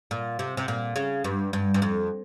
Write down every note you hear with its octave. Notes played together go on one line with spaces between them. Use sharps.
A#2
C3
C3
A#2
C#3
G2
G2
G2
F2